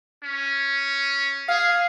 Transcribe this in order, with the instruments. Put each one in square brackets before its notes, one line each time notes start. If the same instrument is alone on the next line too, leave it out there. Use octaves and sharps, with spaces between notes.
[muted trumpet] C#4
[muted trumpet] G#4 [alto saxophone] F5